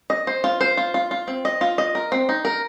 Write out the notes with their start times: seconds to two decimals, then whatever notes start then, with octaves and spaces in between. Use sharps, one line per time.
0.10 D#5
0.27 C5
0.44 F4
0.61 C5
0.77 F4
0.94 F4
1.11 F4
1.28 C4
1.45 D#5
1.61 F4
1.78 D#5
1.95 A#4
2.12 C4
2.29 D#4
2.45 A#4